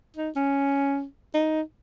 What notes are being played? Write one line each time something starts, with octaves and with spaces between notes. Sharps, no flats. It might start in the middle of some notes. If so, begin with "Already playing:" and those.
D#4
C#4
D#4